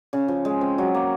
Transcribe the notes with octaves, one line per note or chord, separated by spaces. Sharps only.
C#3
F3
G#3
C4
F#3
A#3